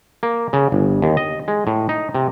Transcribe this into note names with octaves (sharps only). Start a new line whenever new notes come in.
A#3
C#3
G1
D#2
D#5
G#3
A2
D#4
C3